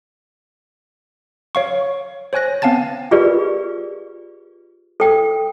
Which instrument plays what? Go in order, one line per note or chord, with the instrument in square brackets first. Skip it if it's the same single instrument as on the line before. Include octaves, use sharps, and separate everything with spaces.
[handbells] C#5 F5 C#6
C5 C#5 G#5 F#6 A#6
B3 C4 F5 G#5 A5 A6
[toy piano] F4 G4 G#4 A#4 B4 D5
A4 G5